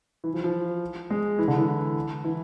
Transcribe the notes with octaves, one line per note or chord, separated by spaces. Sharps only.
E3
F3
F3
G#3
E3
D3
E3
E3